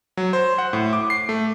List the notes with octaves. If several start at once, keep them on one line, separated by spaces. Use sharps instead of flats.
F#3
C5
F#5
A2
D6
C7
A3